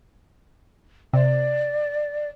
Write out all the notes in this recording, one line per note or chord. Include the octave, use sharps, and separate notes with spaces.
C3 D5